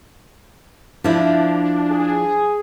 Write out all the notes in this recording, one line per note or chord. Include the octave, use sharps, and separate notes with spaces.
F3 D4 E4
G#4